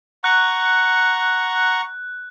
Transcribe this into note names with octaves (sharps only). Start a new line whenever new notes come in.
F#5 A#5 C#6 F#6